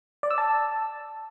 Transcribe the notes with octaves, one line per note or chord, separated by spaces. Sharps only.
D5
E6
A5